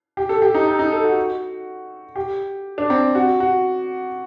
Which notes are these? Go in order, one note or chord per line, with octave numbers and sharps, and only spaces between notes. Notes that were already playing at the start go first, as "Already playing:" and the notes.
G4
A4
G4
D#4
D#4
D#4
A4
F#4
G4
D4
C4
F#4
F#4